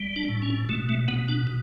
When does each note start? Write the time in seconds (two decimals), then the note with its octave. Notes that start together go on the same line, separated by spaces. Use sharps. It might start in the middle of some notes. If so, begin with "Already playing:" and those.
Already playing: G3
0.16 D4
0.29 A2
0.42 C#4
0.69 B2 A3
0.89 A3
1.08 B2 B3
1.28 D4
1.47 B2